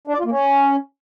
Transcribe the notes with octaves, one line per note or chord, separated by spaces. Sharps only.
D4
D5
F4
A#3
C#4